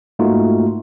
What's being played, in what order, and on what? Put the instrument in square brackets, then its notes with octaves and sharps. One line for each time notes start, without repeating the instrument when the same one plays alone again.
[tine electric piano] G#2 A3 A#3 D#4 F4 F#4